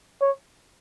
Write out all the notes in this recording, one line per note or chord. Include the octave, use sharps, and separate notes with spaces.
C#5